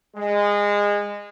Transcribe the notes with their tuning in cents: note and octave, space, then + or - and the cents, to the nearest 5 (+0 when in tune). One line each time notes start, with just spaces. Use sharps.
G#3 -20